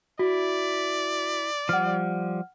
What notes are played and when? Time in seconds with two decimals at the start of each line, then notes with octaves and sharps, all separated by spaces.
0.19 E4 F#4 D5
1.69 F3 G3 F#5 F6